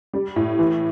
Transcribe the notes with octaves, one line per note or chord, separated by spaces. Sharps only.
G3
A2
E3